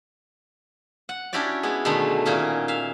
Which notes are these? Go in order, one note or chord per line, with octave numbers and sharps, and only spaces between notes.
F#5
C#4 D4 E4 F#4 G4 D5
G#3 B3 E4
B2 D3 D#3 G#3 A3 B3
A#2 D#3 A#3 C#4 D#4 E4
E5 F5